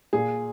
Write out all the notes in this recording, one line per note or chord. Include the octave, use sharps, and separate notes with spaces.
A#2 G#4